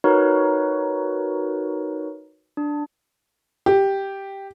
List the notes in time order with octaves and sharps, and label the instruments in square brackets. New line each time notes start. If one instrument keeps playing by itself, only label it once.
[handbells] D#4 F#4 A#4 B4 C#5
D4
[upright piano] G4